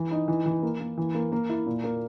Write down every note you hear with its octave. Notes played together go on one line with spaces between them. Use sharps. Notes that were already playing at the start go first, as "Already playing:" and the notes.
Already playing: E3
D#4
E3
E3
A#3
A#3
E3
A#3
A#3
E4
A#2
A#3